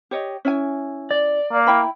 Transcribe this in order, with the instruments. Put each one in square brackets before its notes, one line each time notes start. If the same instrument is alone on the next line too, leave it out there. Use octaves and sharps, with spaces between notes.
[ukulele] G4 C#5 D#5
C#4 E4 G#5
[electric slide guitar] D5
[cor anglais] A#3
[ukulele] E4 G5 B5